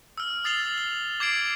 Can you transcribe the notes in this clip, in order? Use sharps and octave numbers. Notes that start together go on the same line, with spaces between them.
E6 F6
D#6 A6 C7 F7 G7
G7
D6 G#6 C7 D7 F#7